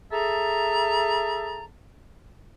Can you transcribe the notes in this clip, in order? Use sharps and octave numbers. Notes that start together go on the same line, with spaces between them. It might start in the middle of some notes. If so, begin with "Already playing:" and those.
G#4 A4 E5 A5 A#5